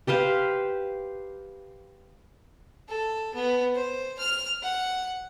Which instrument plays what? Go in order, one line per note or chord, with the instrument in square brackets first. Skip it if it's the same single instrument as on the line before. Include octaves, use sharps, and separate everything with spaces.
[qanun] G4 B4 C5 F5
[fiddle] A4
B3
C5
F6
F#5